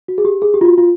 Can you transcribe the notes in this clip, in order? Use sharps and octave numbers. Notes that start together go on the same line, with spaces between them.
F#4
G#4
G4
G#4
G4
F4
F#4
F4